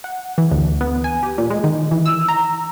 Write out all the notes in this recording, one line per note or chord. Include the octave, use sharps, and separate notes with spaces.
F#5
E3
D2
B3
G#5
G4
A#2
G#3
D#3
E3
E6
A#5